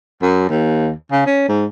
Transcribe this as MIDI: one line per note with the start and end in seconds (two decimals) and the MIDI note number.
0.22 0.46 42
0.50 0.91 39
1.12 1.24 49
1.26 1.47 61
1.49 1.66 44